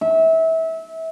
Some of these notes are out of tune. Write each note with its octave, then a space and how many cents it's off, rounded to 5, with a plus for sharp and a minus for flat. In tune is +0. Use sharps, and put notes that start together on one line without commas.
E5 -25